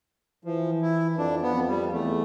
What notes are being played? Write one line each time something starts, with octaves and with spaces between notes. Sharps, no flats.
E3 F3
E4
F2 D4
B3
F2
G3
E2 A3